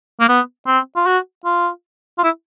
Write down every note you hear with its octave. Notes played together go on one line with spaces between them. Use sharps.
A#3
B3
C4
F4
F#4
F4
F4
E4